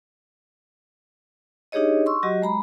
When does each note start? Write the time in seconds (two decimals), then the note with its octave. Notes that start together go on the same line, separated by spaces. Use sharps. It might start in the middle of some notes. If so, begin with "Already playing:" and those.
1.72 D4 D#4 G4 G#4 C#5 D#5
2.06 C6 C#6 E6
2.23 F#3 F#4 G4 D#5
2.42 G#3 A#5 B5